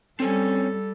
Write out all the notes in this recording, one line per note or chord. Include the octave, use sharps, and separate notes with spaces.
G3 C4 C#4 A4 G#5